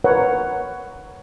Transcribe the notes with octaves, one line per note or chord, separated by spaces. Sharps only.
A#4 B4 C#5 F#5